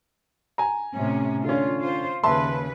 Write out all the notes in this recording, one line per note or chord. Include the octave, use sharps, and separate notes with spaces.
G#5 A#5
A2 C3 C#4
D3 C#4 F4
F4 C5
D#2 C#3 B4 E5 A5 C6